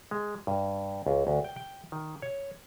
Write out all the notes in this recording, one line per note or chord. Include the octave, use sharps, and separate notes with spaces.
G#3
G2
C#2
D2
G5
G5
D#3
C#5